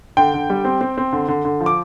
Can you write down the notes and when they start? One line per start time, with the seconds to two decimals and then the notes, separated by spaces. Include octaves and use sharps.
0.17 D3 G5
0.34 D3
0.50 G3
0.65 C4
0.81 C4
0.98 C4
1.13 D3
1.28 D3
1.45 D3
1.60 F3
1.66 D6